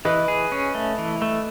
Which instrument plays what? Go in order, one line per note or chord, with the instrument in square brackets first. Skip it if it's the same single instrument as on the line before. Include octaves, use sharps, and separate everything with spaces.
[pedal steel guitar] E3 [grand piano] B4 D#5
[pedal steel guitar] G#4
C#4
A3
E3
A3